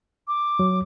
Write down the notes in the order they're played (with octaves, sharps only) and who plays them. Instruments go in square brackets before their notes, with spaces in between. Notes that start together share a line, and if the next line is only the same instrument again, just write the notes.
[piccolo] D6
[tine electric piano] F#3